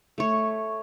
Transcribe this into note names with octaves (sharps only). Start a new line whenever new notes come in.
A3 C#5